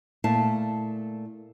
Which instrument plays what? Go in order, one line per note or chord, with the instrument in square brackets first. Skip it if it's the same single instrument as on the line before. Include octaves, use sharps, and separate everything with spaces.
[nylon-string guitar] A#2 A3 E4 F5 A5